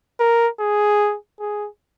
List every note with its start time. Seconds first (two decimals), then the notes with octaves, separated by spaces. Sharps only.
0.20 A#4
0.60 G#4
1.40 G#4